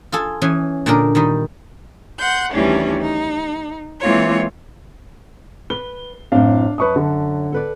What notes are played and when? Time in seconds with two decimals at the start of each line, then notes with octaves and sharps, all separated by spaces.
0.12 F4 G#4 A4
0.42 E3 C#4 G#4
0.86 A#2 D3 D4 D#4 A#4
1.15 D#3 G3 D#4
2.19 F#5 C6 G6
2.52 D2 D#3 E3 G3 C#4 D4
3.00 D#4
4.00 E3 G#3 A#3 C4 F4 C#5
5.70 B4 G7
6.32 F#2 A2 C4 D4 F5
6.78 F#2 B4 C#5 A5 C#6 D#6
6.96 D3
7.52 A4 B4 D5